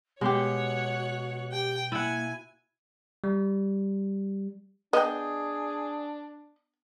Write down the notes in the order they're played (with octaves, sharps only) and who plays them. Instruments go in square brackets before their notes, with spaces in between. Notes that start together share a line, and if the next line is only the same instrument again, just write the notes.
[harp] B2 [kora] G#3 G4 [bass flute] F#4 [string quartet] C#5 F#5
[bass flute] G4 [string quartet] G5
[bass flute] A#3 [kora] E4 F#5 [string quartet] G#5
[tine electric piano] G3
[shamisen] B3 [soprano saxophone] D4 [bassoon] G#4 [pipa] D#5 G5